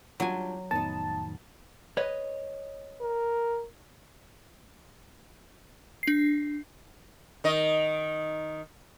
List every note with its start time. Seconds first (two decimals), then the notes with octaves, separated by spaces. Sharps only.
0.20 F#3 G3 D4 F4 G#5
0.71 F2 A2 D#3 B3 D#4 A5
1.97 B4 C#5 D#5
3.01 A#4
6.03 D4 C7
7.44 D#3 D#5